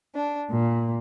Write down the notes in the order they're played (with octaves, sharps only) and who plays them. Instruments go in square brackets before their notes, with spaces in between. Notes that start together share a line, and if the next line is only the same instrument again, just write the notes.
[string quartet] D4
A#2